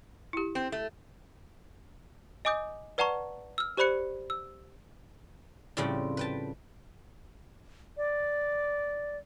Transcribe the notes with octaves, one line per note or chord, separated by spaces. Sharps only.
E4 G4
C4
A3
D#5 G#5 D6 D#6 G6
B4 D5 F#5 A5 A#5 C#6
E6 F6
G4 C5 D5 B5 F#6 C#7
E6
A2 C#3 F3 G3 C4 G5
B4 G5 A5
D5